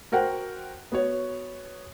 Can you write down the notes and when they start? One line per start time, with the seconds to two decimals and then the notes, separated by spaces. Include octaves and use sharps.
0.12 F#4 A#4 C5 F#5 G5
0.92 B3 F#4 C#5